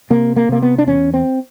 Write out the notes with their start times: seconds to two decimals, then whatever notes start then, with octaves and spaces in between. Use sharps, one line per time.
0.10 C3 A#3
0.36 A#3
0.49 C3 A#3
0.62 B3
0.78 D4
0.87 E2 C#4
1.14 C4